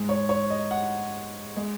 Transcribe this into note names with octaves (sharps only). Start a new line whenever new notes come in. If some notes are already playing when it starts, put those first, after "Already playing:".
Already playing: G#2 G#3
C#5
C#5
D#5
F#5
G#3